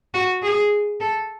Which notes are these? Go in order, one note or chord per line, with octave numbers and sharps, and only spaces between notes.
F#4
G#4
A4